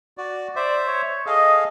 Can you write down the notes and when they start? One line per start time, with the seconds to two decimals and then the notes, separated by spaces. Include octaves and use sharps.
0.18 F#4 D5
0.56 C5 D5 E5
0.88 C#5
1.26 G#4 A4 D#5 F5